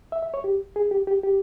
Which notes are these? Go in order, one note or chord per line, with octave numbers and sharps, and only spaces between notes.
E5
E5
C#5
G4
G#4
G4
G4
G4